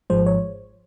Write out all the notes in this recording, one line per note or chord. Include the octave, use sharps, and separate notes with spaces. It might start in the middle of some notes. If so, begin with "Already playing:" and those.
G#1 G#2 F3 G#3 C5
C#5